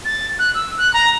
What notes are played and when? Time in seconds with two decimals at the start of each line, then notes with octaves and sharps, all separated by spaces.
0.05 A6
0.39 F#6
0.54 E6
0.78 F#6
0.94 A#5